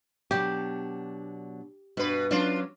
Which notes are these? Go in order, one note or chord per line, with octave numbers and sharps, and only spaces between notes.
B2 F#3 D4 G4
G2 B2 B4
F#3 C#4 D4 F4